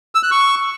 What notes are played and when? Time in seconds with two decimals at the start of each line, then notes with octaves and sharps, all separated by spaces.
0.15 E6
0.23 F#6
0.31 C#6